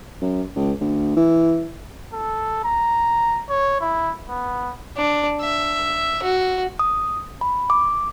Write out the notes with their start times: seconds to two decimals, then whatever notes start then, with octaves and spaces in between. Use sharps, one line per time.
0.21 F#2
0.55 C#2
0.80 D2
1.16 E3
2.13 A4
2.64 A#5
3.49 C#5
3.81 E4
4.29 B3
4.97 D4
5.42 E5
6.23 F#4
6.79 D#6
7.41 B5
7.70 D6